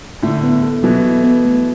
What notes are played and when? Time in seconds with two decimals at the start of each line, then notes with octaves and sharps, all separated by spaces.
0.22 A2 D3 E4
0.43 B3
0.63 A4
0.83 B2 E3 F#3
1.04 E4
1.24 B3
1.44 A3